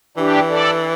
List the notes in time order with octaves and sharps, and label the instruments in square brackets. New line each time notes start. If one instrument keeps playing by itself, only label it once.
[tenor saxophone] E3 [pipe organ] D4 G4
[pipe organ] A4 D5